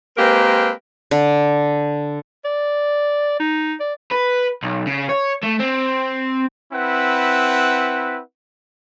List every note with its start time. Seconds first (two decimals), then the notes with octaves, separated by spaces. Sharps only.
0.18 G#3 A#3 C4 G4 A#4 B4
1.11 D3
2.45 D5
3.40 D#4
3.80 D5
4.12 B4
4.63 B1
4.87 C#3
5.09 C#5
5.43 A3
5.59 C4
6.73 C4 E4 B4 F#5